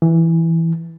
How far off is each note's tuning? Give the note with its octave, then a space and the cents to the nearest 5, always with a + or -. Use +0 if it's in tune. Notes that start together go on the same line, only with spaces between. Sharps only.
E3 +0